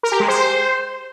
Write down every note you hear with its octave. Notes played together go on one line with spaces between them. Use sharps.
A#4
G4
G#3
C5